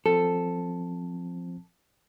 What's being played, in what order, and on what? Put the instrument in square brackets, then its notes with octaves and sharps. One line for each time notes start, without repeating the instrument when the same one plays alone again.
[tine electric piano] F3 C4 [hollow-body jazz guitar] A4